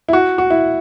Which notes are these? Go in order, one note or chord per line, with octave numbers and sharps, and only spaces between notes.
E4
F#4
F#4
E4